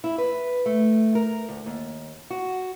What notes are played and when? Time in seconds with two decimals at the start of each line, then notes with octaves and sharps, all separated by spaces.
0.04 E4
0.18 B4
0.66 A3
1.15 A#4
1.49 D2
1.66 D#2
2.31 F#4